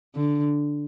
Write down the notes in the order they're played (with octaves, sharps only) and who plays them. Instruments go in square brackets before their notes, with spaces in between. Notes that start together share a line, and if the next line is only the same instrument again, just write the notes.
[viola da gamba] D3